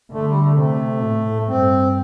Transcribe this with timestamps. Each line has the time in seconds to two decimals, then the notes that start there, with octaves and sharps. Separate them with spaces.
0.12 D3 A3
0.26 G3
0.42 A3
0.56 C3 A3
1.03 A2
1.47 G2 C4